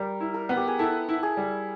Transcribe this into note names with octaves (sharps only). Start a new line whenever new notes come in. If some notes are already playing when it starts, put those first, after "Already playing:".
Already playing: G3 A#4
E4
A#4
B3
G4
G#4
E4 A4
E4
G#4
G3